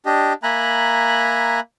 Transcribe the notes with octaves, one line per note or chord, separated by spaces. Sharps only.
D4 G4 D#5
A#3 E5 G#5 A#5 B5 F#6